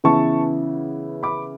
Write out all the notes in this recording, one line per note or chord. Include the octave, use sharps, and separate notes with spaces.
C#3 E3 B3 E4 A5 C#6
B5 D6